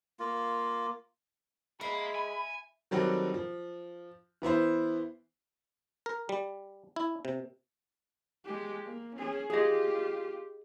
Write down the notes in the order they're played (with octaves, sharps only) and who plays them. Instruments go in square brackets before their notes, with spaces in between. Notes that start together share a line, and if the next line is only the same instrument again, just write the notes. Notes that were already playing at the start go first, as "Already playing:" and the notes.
[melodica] A#3 F4
[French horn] G#3 [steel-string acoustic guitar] E4 [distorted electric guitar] A#4 F5 [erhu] B5
[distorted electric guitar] G#5
[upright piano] D#3 F#3 G3 C4 F#4 A4
F3
E3 B3 E4 C5
[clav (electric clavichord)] A#4
G3
E4
C3
[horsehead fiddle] G#3 G4
A#3
C#4 G#4
[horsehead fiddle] F4 G4 [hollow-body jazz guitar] G#4 D#5